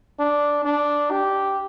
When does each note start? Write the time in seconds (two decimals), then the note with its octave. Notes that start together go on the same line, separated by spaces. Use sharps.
0.20 D4
0.65 D4
1.11 G4